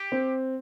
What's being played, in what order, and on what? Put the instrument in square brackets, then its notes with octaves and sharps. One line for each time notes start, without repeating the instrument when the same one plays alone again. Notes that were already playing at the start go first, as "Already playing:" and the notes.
Already playing: [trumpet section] G4
[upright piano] C4